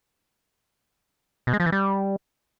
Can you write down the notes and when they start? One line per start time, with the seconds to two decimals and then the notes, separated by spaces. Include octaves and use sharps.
1.47 B2
1.53 G#3
1.60 F3
1.66 E3
1.72 G3